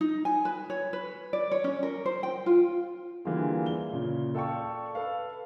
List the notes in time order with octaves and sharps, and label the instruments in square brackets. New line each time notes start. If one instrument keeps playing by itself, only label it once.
[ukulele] D#4
G#5
B4
C#5
B4
D5
C#5
C#4
A#4
C5
G5
F4
[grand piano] D3 E3 G3 A#3 F4 G#4
G7
A#2 C#3
A4 D5 F5 G5 A5 C#6
A4 B4 F5